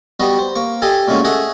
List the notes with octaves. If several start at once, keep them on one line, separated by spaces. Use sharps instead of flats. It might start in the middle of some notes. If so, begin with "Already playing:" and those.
G3 B3 F#4 D#5
C5
A#3 C#6
G4 A4 D5 D#5 G#5
A#2 G#3 A3 C#4 F#4
G#4 A4 D#5 E5 F#5